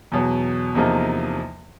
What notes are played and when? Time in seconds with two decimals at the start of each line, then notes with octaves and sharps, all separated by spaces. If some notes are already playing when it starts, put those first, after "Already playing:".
0.12 E2 B2 F#3
0.75 E2 C3 F3 A#3 D#4